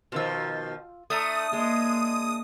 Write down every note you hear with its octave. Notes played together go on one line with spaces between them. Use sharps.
B2 D#3 F3 F4 E6
A3 D4 E4 A#5 D#6
G#3 A#3